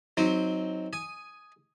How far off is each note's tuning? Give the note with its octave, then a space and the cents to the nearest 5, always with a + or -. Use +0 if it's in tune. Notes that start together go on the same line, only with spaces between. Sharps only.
F#3 +0 C4 +0 D#4 +20
G#5 +5 D#6 +0